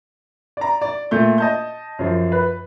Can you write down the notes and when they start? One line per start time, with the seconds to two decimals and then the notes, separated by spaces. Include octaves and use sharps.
0.57 D5 A#5
0.81 D5
1.11 A#2 A3 G6
1.38 D#5 A5 G6
1.99 F#2 F3
2.32 B4